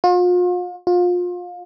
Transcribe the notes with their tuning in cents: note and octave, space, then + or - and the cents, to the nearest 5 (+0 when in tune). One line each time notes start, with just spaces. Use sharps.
F4 +40
F4 +30